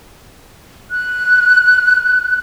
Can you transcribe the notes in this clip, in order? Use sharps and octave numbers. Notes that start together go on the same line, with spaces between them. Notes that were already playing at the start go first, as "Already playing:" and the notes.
F#6